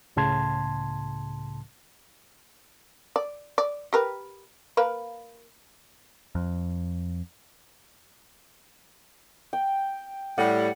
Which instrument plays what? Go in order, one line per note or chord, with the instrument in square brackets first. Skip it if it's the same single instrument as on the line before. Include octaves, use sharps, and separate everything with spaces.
[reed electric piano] C#2 A2 C#3 A5 C6 G#6
[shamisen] D5
D5
G4 A#4 B4
A#3 A#4 B4
[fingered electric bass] F2
[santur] G5
[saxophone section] A2 G3 [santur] F#5